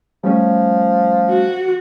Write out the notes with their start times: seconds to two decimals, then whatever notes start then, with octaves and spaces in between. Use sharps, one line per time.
0.24 F3 G3 A3 C#4
1.30 F#4